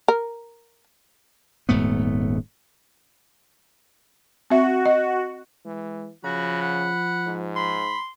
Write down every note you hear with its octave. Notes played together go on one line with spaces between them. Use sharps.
A#4
D#1 G#2 A3 B3
C4 F#4 E5
D#5
E3 G#3
C#3 F3 F#4 B5
F#5
G#2
B5 C6